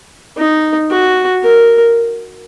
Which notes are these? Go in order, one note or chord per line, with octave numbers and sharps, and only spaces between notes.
D#4
F#4
A#4